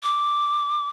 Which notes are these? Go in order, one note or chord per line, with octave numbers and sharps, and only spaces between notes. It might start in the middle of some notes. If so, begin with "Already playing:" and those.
D6